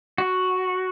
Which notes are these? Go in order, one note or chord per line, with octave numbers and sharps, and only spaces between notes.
F#4